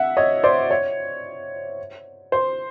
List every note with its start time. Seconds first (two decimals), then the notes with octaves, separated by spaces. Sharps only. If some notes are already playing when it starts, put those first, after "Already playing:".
Already playing: E5 F#5
0.17 C#5 D#5
0.44 C5 D5
0.71 C#5
2.32 C5